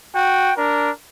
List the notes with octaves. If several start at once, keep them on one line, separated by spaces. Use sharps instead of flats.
F#4 G5
D4 A#4